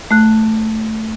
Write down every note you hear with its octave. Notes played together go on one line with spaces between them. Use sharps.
A3 F#6